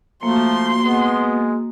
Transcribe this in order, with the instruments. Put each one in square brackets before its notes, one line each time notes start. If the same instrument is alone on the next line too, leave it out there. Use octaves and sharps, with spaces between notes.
[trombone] F3 [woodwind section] A3 [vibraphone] A#3 F#4 [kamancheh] C6
[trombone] G#3 [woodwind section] B3